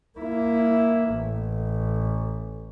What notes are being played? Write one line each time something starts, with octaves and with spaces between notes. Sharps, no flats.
A#3 E4
A1